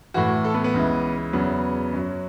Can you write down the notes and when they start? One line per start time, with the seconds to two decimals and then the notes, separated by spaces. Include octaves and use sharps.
0.14 A2 E3 F#4
0.45 A4
0.54 B3
0.64 B3
0.74 C#2 C#3 E3
1.33 E2 C#3 F#3 B3
1.93 F#2 F#3